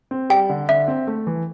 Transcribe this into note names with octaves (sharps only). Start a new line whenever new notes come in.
C4
G3 G5
D3
D3 E5
C4
A3
E3